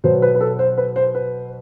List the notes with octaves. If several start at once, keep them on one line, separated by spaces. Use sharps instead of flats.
B2 F#3 B3 C5
B4
B4
A4
C5
B4
C5
B4